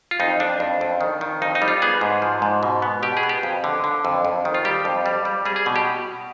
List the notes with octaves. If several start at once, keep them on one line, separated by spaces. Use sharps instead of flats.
F4
F2 D#4
F2 D4
F2
F2
D#3
D#3
F2 D#4
D#4
G3
F4
B3 G#4
G#2
F3
G#2
B2
B3
B2 G4
G#4
B3
G4
F2
D3
D3
F2
F2
D#3
F4
G3 G4
F2
G3
G3
G3 G#4
G#4
B2
G4